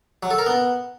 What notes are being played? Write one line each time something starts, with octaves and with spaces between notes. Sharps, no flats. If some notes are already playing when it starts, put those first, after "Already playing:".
F#3
A4
A#4
B3